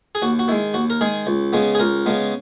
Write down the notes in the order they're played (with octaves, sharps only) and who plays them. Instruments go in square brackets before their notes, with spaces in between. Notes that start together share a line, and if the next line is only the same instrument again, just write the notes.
[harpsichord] G#4
D#2 F#4
F#4
D#3 E4
G#3
D#2 F#4
A#4
D#3 G#3 G#4
C#2
C#3 G#3 B3
G#4
C#2 A#4
C#3 G#3 B3